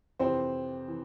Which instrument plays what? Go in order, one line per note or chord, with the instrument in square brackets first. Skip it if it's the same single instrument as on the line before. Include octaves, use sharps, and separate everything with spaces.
[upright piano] F2 C3 E3 C4 C5
E3